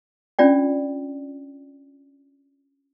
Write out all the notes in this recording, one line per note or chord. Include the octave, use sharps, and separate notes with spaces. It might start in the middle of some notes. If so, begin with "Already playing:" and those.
C#4 D4 F4 D5 G5